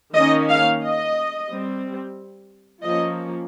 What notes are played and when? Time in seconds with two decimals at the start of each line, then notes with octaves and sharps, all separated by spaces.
0.15 D#3 A#3 C#4 D#5
0.49 F5
0.83 D#5
1.50 G3 C4
2.83 F3 A#3 C#4 D#5